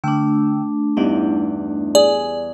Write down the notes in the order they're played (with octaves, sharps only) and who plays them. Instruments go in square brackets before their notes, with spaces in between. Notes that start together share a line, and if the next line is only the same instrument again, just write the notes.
[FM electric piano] D3 G5 E6 [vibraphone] A3 D4
[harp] E2 G2 [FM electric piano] D#4 E4
[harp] G#4 [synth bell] D5